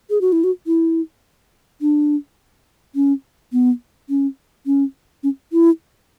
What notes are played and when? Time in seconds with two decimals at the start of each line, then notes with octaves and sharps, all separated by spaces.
0.10 G#4
0.21 F#4
0.32 E4
0.44 F#4
0.67 E4
1.81 D4
2.95 C#4
3.53 B3
4.09 C#4
4.66 C#4
5.23 C#4
5.52 E4